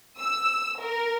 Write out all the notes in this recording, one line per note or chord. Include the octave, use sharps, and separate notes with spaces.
E6
A#4